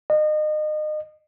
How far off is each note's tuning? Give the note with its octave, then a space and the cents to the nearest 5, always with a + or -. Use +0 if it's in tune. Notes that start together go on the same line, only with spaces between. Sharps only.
D#5 -30